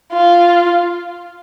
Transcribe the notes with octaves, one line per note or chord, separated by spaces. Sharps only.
F4